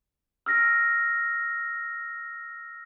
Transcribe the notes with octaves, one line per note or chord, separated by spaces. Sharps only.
E6 F6 A#6